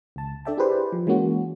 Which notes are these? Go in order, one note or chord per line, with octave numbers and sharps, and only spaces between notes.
C#2 A5
D4 A4 D5 E5 G5 A5
E4 G4 G#4 B4 C5 D5
F3
E3 G#3 A#3 C#4 F#4